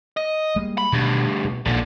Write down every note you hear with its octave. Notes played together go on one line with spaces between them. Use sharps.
D#5
G3 G#3 A#3
B5
D2 G2 B2 D#3 F#3
B2
A#1 A#2 D3 D#3